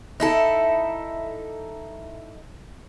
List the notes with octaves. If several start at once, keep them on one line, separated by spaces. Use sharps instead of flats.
D#4 E4 A4